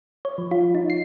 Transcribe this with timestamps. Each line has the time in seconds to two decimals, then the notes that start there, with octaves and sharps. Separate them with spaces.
0.25 C#5
0.38 F3
0.51 F4
0.75 D#4
0.90 C7